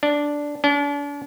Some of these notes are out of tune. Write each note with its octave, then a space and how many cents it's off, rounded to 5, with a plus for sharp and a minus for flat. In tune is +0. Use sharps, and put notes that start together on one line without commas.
D4 -5
D4 -40